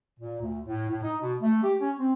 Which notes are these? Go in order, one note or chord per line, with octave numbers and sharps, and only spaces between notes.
A#2
D2
A2
A2
D#4
B2
A3
G4
C#4
C4